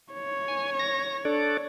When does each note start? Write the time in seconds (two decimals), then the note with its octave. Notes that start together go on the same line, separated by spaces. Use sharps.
0.13 C#5
0.48 G#5
0.79 A#6
1.25 D4 A4 D5